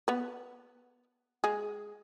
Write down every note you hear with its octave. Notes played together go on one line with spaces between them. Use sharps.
B3 B4
G#3 G#4